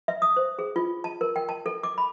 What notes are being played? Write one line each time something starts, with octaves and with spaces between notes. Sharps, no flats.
E5
D#6
C5
G#4
F4
A5
A#4
G5
A5
A4
D6
B5